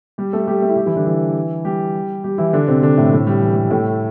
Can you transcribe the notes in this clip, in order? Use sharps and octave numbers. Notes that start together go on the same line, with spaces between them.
G3 G4
A3 A4
G3 G4
A3 A4
E4
G3 G4
E3 E4
D3 D4
E3 E4
G3 G4
G3 G4
E3 E4
D3 D4
C3 C4
D3 D4
A2 A3
A2 A3
G3
E3
G3
A2 A3